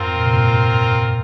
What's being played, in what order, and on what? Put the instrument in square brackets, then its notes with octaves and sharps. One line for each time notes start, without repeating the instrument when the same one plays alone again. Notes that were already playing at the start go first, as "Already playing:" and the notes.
Already playing: [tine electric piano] F2 G#2 [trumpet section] C4 F4 A#4
[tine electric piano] A#2
C3
G2 A#2